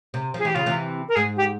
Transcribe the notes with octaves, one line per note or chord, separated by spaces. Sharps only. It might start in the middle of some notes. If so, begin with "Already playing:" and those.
C3
F3 G#4
E3 G4
C#3 F4
C3 E3
A#4
G#2 G#4
G4